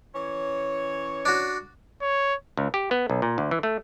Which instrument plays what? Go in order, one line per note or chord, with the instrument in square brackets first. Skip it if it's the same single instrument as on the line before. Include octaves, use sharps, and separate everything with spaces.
[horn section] E3 C#4 C#5
[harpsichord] D4 F#4
[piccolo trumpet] C#5
[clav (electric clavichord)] C#2
G4
B3
B1
A#2
D2
E3
A3